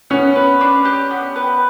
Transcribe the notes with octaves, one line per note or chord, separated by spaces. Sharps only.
B3 C#4
B4
D4
G4
B3
B4